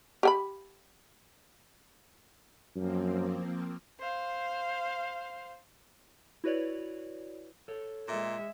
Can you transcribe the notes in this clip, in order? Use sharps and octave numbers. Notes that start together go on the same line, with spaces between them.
G4 G5 B5
F#2 F3 A#3 C4
C5 F5
E4 F#4 B4 C#5 D5
A4 C#5
A#2 G#3 E5